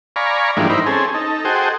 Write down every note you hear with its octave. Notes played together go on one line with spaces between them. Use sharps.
D5 F5 G#5 A#5 B5 C#6
G#2 E3 F3 G3 A#3 D4
D#4 E4 A#4 C5 B5
C4 C#4 G#4 A4
D#4 A4
F#4 G#4 A4 C5 D#5 G5